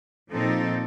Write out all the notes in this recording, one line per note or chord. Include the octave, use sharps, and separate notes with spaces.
A#2 F3 C4 D#4 A4